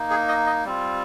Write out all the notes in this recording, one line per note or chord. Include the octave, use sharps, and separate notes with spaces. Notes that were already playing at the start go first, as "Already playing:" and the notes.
Already playing: A#3 D#4
G#4
D#5
D#5
G3 C4 F4